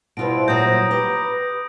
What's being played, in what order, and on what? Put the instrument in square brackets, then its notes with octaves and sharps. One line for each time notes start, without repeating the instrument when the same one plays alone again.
[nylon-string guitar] B2 F4 B4 [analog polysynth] G3 E4 C5 [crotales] D7
[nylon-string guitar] A#2 F#3 [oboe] A#5 [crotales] D#6 G6
[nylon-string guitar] G4 [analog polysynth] B4